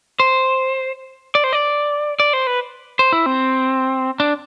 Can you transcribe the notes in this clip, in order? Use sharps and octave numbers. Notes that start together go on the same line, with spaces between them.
C5
D5
C5
D5
D5
C5
B4
C5
E4
C4
D4